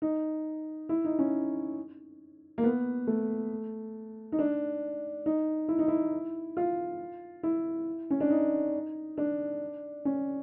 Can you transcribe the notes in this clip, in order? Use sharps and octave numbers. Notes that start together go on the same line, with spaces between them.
D#4
E4
D#4
C#4
A#3
B3
A3
D#4
D4
D#4
E4
D#4
E4
F4
E4
C#4
D4
D#4
D4
C#4